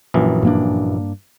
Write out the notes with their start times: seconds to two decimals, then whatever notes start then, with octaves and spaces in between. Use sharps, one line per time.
0.14 A#1 F#2 E3
0.43 G2 A#3 D4